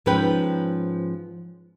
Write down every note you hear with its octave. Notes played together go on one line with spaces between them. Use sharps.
G#2 F3 C#4 B4 G5